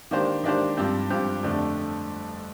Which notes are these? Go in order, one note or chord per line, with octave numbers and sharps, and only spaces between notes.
D#3 A#3 D4 G4 C5
D#3 A#3 D4 G4 C5
G2 F3 C4 G4
G2 F3 C4 G4
F2 D3 A3 D4 G4